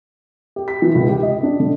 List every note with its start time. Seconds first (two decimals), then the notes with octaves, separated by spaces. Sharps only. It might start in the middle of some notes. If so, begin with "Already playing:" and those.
0.56 G4
0.68 B6
0.82 E3
0.95 C#2
1.09 G4
1.23 D#5
1.43 D4
1.60 D3